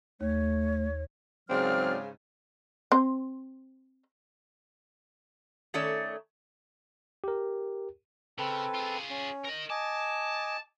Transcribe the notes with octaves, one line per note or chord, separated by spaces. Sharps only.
D#2 A3 C#5
G#2 C#3 F#3 C4 D5 F6
C4 C5
D#3 A3 C#4 A4 C#5 D5
G4 A#4
C#3 C4 A4 B4
F4 G#4
C#4
A#4 D#5
D#5 G#5 A5 D6